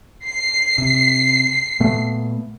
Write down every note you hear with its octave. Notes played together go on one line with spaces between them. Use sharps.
C7
C3
A#2 A3 B3